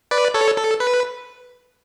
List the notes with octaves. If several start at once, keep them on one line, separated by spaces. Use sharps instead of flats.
B4 D5
A4 C#5
A4
B4